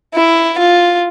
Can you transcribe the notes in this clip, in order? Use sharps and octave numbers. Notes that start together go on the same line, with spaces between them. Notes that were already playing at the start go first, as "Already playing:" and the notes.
E4
F4